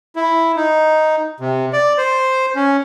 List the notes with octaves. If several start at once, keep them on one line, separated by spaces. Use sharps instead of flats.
E4
D#4
C3
D5
C5
C#4